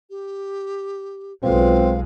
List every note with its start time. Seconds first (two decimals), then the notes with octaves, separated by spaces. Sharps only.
0.10 G4
1.43 B1 G#3 C4 F4 B4 F5